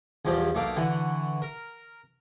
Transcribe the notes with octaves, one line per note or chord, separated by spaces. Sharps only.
A#1 E2 F3 G3
B1 A3 A#3 D5 F5
D3 E3 F#4
A#4